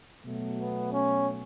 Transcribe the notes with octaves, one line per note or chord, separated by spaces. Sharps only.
B2 F#3 A3
B3
C#4